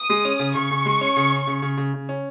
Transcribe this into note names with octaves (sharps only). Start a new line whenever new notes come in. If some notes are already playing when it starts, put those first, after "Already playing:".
Already playing: D#6
G#3
C#4
C#3
C#3 C#6
C#3
G#3
C#4
C#3
C#4
C#3
C#3
C#3
C#3
C#4